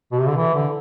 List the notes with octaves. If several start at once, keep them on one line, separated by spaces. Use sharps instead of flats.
B2
C3
D3
E3
D3